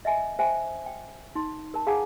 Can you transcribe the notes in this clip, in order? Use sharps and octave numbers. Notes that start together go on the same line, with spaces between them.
D#5 E5 G#5
C5 E5 G5 G#5
G5
D#4 C6
A#4 A5
G#4 F5 F#5 G#5 A#5 D6